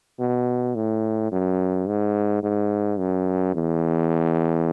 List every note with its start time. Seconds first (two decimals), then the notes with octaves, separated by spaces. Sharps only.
0.20 B2
0.75 A2
1.32 F#2
1.87 G#2
2.43 G#2
2.99 F#2
3.54 E2